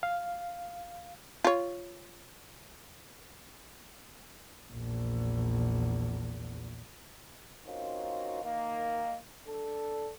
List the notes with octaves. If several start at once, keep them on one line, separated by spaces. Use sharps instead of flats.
F5
F4 C#5
A#1 E2
A#3 C4 C#4 D#4 F4 F#4
D#3 A#3
D4 A4